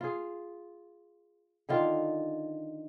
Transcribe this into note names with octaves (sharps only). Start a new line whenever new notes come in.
F4 G#4
D3 D#3 F4